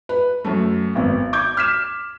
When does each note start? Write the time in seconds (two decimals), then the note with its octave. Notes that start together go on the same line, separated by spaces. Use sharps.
0.09 B4
0.44 F#2 A3
0.95 G#1 B3
1.33 D6 G6 G#6
1.57 F6 B6 E7